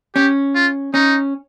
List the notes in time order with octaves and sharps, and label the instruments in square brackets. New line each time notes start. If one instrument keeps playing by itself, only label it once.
[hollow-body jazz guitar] C#4 [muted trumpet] G4
[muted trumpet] F4
[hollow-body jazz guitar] C#4 [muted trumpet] D#4